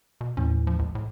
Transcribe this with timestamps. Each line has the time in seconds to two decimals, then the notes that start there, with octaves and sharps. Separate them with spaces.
0.21 B2
0.37 D#2 A2 E3 C#4
0.67 F3
0.79 C#2
0.95 A2